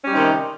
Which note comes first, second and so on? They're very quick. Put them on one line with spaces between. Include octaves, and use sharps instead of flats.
C#4 G3 D#4 C3 D#3